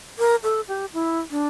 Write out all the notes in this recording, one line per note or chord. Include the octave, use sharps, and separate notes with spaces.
A#4
A4
G4
E4
D4